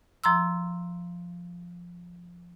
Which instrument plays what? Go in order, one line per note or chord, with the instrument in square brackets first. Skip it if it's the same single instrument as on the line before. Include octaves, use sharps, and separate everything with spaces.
[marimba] F3 A#5 C6 E6